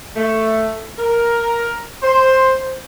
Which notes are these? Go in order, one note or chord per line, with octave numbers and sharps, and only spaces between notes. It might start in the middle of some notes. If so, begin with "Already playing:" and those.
A3
A#4
C5